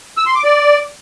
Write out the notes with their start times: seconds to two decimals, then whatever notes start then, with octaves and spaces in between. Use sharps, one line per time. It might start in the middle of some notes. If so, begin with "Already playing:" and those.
0.17 E6
0.26 C6
0.35 D6
0.44 D5